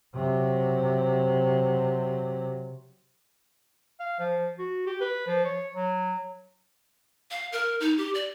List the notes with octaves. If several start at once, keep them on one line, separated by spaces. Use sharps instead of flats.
C3 F#3
F5
F3
F#4
G4
B4
F3
C#5
F#3
F5
A#4
D#4
G4
D5